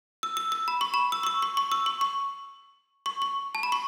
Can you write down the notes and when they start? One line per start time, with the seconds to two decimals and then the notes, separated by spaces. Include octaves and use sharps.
0.23 E6
0.37 E6
0.52 E6
0.68 B5
0.81 C#6
0.94 B5
1.12 E6
1.23 C#6
1.27 E6
1.42 C#6
1.57 C#6
1.72 E6
1.86 C#6
2.01 C#6
3.06 C#6
3.22 C#6
3.55 A5
3.63 B5
3.72 C#6